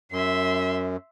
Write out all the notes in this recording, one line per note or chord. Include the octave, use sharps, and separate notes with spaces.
F#2 E5 C6